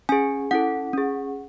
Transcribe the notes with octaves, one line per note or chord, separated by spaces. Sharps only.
C#4 G#4 G#5
C#4 E4 A4 F#5
C#4 G#4